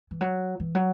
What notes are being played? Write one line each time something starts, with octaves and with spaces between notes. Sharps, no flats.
E3
F#3
E3
F#3